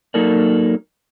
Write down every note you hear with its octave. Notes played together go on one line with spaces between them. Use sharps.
F#3 A#3 D#4 A4 A#4 D5